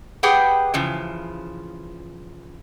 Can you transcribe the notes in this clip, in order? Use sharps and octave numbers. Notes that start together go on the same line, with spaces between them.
G4 G#4 B4 F#5 G5
C#3 E3 F3